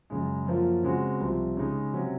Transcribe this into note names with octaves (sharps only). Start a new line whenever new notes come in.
F#2 C#3 G#3
F#2 F3 A#3 F4
C#3 G#3 C4 F#4
C2 C3 F3 C4
C#3 G#3 D#4
C3 F#3 C#4